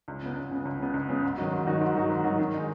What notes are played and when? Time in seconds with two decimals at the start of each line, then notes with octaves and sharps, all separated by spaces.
0.08 C#2
0.23 C#3 B3
0.36 C#2
0.51 C#3 B3
0.65 C#2
0.80 C#3 B3
0.94 C#2
1.09 C#3 B3
1.23 G#2
1.38 D#3 F#3 D#4 F#4
1.52 G#2
1.67 D#3 F#3 D#4 F#4
1.81 G#2
1.95 D#3 F#3 D#4 F#4
2.10 G#2
2.24 D#3 F#3 D#4 F#4
2.38 D#3
2.54 G#3 D#4